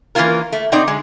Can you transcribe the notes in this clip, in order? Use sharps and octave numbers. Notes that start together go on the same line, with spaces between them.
E3 A#3 C4 C#4 F4 A#4
A3
B2 C4 D#4 D5
D3 G#3